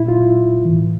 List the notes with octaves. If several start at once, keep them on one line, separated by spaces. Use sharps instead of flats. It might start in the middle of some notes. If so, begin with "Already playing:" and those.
Already playing: A#2 E4
F4
A2 E3